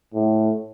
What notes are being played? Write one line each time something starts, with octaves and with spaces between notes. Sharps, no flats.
A2